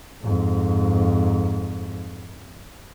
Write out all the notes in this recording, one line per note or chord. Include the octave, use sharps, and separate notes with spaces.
F2 G#2